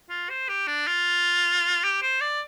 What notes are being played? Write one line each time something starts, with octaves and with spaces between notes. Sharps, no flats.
F4
C5
G4
D4
F4
G4
C5
D5